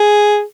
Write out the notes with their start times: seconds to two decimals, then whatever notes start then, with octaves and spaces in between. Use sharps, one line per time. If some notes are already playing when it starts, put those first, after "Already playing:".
Already playing: G#4